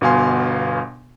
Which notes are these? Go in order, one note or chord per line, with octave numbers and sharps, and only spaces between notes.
G1 B2 B3 F5 G#5 C6